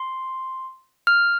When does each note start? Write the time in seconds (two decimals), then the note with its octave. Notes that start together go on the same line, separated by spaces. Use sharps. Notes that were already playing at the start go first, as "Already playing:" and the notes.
Already playing: C6
1.07 F6